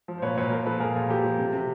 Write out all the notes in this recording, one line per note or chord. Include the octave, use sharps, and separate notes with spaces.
F3
C5
A#2 B4 C#5
A#2 B4 C#5
F3 A#4 C5
F3 A4 B4
A#2 G#4 A#4
A#2
F3 G4 A4
F3
C3
C3